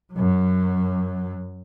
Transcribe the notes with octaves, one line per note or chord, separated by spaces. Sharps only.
F#2 F#3